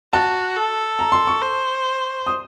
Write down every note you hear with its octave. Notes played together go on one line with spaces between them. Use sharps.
F#4 A5
A4
A#5
C6
C#6
C5
D#6